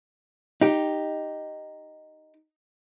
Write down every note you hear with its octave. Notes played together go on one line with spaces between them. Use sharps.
D#4 G4